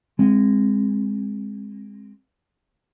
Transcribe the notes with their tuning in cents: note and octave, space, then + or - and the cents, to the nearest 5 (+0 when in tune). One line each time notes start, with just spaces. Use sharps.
G#3 -15 C4 +10